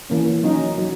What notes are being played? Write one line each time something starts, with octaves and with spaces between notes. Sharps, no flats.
E3 A#3 C#4
F#3 C#4 D#4
F#3